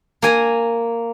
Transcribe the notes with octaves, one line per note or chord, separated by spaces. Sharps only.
A#3 G#5 A#5